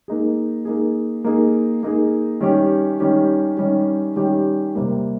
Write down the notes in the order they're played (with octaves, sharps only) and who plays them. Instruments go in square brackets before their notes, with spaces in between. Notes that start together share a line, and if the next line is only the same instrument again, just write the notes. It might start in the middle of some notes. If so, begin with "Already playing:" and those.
[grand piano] A#3 D#4 G#4
A#3 D#4 G#4
A#3 D#4 G#4
A#3 D#4 G#4
D#3 G3 C#4 G4
D#3 G3 C#4 G4
D#3 G3 C#4 G4
D#3 G3 C#4 G4
C3 G3 A#3